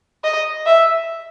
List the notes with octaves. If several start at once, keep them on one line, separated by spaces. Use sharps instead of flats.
D#5
E5